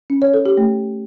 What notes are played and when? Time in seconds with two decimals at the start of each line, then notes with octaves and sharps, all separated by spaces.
0.10 C#4
0.22 C#5
0.34 A4
0.46 G4
0.57 A3